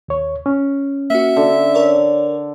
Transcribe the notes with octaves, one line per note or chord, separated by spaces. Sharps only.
D#2 C#5
C#4
A#3 F#4 E5
D3
A#4 C#5 D5